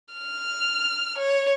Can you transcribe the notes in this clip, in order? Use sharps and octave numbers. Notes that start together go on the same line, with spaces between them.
F6
C#5